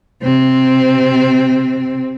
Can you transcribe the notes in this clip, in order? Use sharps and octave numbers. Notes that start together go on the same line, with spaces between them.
C3 C4